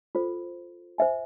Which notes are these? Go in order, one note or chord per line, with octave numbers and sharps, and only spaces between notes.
F4 A4 C5
C5 E5 G#5